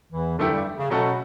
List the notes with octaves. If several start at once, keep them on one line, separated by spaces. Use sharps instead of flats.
E2 E3
F#2 D3 F#3 A3 E4 G4
G2 G3
C#3
B2 F#3 A3 C#4 F#4 A4